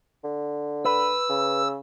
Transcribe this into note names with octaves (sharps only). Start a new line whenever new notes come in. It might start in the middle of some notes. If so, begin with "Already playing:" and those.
D3
B4 E6
C#3